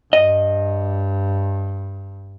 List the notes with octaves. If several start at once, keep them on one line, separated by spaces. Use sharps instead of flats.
G2 D#5